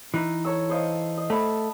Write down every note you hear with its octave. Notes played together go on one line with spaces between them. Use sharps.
E3 D#4
A4 C#5 E6
C5 D#5 F5
D#5
A3 A5 B5